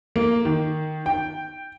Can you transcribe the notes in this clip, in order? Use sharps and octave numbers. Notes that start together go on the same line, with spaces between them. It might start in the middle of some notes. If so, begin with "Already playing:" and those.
A#3
D#3
G5